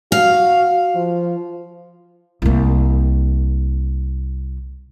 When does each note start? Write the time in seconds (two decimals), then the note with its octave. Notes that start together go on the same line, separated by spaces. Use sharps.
0.12 F#4 F5
0.95 F3
2.42 C2 A#3